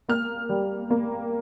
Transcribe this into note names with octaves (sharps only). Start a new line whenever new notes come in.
A#3 F6
G3
A#3